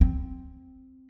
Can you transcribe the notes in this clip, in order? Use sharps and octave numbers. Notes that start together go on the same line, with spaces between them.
C4